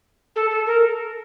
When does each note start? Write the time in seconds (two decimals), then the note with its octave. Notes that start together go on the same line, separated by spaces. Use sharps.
0.35 A4
0.50 A4
0.66 A#4